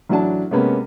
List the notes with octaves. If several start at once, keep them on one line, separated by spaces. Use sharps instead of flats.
A1 F#3 D4 A5
C3 G#3 A#3 B3 C#4